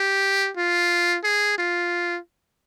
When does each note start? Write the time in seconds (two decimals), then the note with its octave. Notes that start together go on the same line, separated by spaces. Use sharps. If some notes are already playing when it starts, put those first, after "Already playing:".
Already playing: G4
0.57 F4
1.24 G#4
1.58 F4